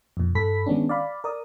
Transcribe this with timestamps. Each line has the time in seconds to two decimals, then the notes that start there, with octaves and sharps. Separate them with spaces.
0.17 F2 A#2
0.35 G2 A4 B5 B6
0.66 D#3 G#3 B3 C#4 D4
0.89 D5 F5 B5
1.24 A#4 D5 D#6